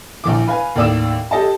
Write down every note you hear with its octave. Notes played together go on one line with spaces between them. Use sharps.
A#1 E3 D6
B4 F5 G#5
D#2 A2 D5 D6 E6 E7
G4 A4 D#5 A5